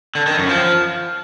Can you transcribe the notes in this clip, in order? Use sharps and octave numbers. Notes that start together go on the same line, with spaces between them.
D3
D#3
F#2
F3